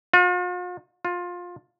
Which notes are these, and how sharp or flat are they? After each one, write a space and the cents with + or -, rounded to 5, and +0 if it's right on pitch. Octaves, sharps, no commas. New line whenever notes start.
F4 +45
F4 +20